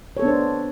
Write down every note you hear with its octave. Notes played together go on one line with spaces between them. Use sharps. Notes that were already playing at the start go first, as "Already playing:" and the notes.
B3 D4 A4 C5 C#5